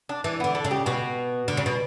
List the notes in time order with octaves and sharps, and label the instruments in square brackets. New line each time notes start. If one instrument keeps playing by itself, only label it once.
[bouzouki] D4
[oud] E3 [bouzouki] D4
[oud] D3 [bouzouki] B3
[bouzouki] A4
[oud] C#3
[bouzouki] G4
[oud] B2 [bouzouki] F#4
[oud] D3
C#3
B2